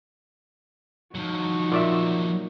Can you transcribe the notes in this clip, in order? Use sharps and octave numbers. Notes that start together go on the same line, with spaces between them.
F3 F#3 D#4 F#4
A#2 D5 E5